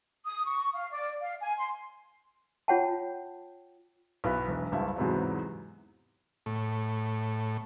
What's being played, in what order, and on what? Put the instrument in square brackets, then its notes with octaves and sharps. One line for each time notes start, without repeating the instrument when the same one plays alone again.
[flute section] D#6
C#6
F5
D5
F5
G#5
C6
[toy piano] F4 C#5 F#5 G5 A5
[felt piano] B1 B3 E4 B4
E1
F#1 C#2 G2 E5 A5
E2 G#2 C3 F#3 B3
[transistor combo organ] A2